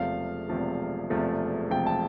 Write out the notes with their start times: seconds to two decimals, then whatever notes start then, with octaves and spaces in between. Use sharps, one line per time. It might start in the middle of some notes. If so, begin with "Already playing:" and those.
Already playing: E1 E2 C3 F3 A3 F5
0.49 E1 E2 C3 F3 A3
1.10 E1 E2 C3 F3 A3
1.71 E1 E2 C3 F3 A3 G5
1.86 A5